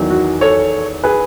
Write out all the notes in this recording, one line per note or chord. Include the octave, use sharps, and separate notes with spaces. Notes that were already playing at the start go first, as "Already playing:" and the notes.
Already playing: E2 D#3 F#3
F#4
A4 C#5
G#4 B4